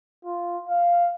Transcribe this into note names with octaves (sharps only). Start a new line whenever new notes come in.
F4
F5